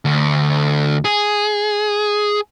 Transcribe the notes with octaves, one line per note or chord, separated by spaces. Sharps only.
D2
G#4